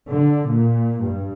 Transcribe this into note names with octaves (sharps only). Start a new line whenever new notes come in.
D3
A#2
G2